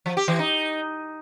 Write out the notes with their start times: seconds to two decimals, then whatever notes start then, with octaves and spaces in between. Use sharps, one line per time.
0.06 F3
0.17 G4
0.28 E3
0.39 D#4